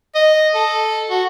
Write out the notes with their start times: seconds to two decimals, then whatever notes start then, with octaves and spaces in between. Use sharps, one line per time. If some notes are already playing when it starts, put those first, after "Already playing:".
0.15 D#5
0.55 A4
1.10 F#4